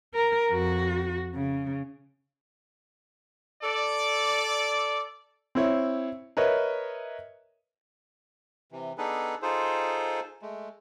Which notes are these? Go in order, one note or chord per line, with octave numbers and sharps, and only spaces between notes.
A#4
F2 F#4
C#3
A4 D5
C4 E4 C#5
A#4 B4 C#5 D#5 E5
C3 E3
B3 D4 D#4 G#4 A4 B4
D#4 F4 G#4 A4 C5
G#3 A3